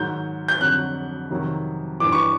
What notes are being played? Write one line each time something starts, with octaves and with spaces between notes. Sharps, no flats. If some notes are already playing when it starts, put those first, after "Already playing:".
Already playing: G#2 D#3 F#3 G6
G6
F2 D3 F#3 F#6
F2 C3 D#3 F#3
G2 E3 D6
C#6